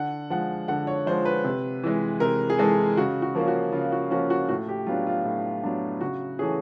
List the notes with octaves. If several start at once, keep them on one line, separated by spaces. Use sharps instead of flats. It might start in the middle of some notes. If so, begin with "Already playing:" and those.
Already playing: D3 F#5
F3 G#3 F#5
D3 F#5
C#5
F3 G#3 C5
B4
C3
E3 G#3
C3 A#4
G#4
E3 G#3 A4
C#3 F#4
F#4
F3 A#3 C#4
F#4
C#3 F4
F#4
F3 A#3 C#4 F#4
F#4
A2 F#4
G4
F#3 B3 D4 F4
F4
A2
F#3 B3 D4
C#3 F#4
E3 A3 C#4 G#4